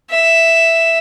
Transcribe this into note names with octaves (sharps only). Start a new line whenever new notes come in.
E5